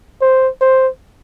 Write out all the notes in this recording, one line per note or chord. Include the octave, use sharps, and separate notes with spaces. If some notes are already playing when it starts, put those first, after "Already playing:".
C5
C5